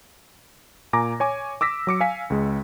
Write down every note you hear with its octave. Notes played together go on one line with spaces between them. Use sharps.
A#2 G#5 A#5 D6 A#6
C#5 G#5 D6
D6 E6 A#6 B6
F#3 D6 C#7
F5 G#5 B6
C#2 G#3